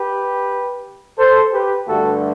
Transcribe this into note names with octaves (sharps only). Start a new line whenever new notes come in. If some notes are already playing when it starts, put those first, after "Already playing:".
Already playing: G4 B4
A4 C5
G4 B4
G2 D3 A3 F#4 A4